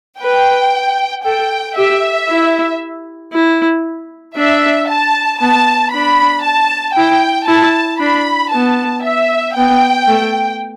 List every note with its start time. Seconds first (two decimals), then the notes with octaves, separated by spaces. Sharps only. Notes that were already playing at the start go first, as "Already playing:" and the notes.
0.21 B4 G5
1.25 A4 G5
1.77 G4 E5
2.29 E4
3.33 E4
4.37 D4 E5
4.89 A5
5.41 B3 A5
5.93 D4 B5
6.45 A5
6.96 E4 G5
7.48 E4 A5
8.01 D4 B5
8.52 B3 A5
9.04 E5
9.56 B3 G5
10.08 A3